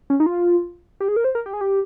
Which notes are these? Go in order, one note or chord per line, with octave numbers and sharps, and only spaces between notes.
C#4
D#4
F4
G4
G#4
A#4
C5
A#4
G4
G#4
G4